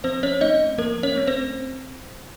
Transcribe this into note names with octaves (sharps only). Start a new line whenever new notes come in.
F3 C4 C5
C#4 C#5
A3 C4 D#4 D#5
F3 A#3 A#4
C#4 C#5
A3 C4
C4 C5